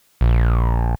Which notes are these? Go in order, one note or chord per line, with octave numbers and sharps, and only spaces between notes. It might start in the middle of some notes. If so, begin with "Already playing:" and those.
A#1